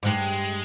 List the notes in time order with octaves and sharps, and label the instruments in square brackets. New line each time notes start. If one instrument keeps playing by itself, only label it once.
[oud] G#2
[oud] G2 [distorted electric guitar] G#3